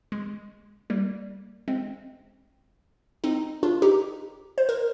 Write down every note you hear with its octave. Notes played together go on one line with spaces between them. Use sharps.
G#3
G3 A#3
G#3 C4
C4 D#4
D4 F4
D#4 G4
C5
A#4